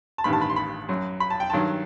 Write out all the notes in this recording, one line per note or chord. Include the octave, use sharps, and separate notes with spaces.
A5
A1 G2 D#3 B5
A5
B5
C6
B5
F#2 F#3
B5
A5
G5
G2 D#3 F#3 A5